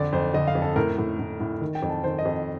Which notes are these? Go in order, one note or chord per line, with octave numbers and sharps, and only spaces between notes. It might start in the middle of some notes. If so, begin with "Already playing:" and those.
Already playing: F2 D3 D5
F2 C5
D3 D#5
F5
F2
A4
A2 A#4
A2
A2
A2
D#3
G5
F2
A5
D#3 C5
D#5
F2